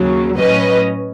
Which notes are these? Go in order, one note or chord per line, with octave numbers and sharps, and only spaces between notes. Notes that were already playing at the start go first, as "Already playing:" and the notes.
Already playing: D#2 C#3 F#3
A2 F#3 C#4 B4 D#5